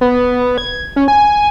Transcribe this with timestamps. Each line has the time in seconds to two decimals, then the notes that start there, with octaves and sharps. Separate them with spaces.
0.01 B3
0.58 G#6
0.96 C#4
1.08 G#5